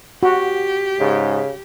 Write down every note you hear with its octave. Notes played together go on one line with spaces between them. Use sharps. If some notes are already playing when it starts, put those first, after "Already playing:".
F#4 G4
G#2 C#3